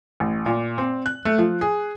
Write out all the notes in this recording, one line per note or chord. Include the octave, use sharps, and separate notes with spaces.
A1
A#2
C4
F#6
A3
F3
G#4